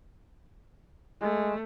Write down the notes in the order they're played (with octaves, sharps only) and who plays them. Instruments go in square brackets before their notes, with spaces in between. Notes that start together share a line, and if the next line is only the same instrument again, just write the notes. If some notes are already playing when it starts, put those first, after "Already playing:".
[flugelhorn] G#3 [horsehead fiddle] A3